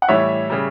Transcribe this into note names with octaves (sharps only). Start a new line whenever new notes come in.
F#5
A2 E3 G3 C#5 E5
C#3 G3